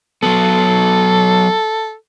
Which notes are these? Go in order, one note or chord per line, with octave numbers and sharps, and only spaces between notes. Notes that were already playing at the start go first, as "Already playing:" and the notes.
F#3 B3 A4